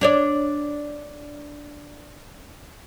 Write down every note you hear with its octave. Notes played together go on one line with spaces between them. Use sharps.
D4 C#5 D5